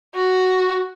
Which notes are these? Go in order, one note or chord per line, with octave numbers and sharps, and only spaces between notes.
F#4